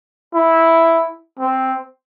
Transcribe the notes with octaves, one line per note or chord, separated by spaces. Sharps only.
E4
C4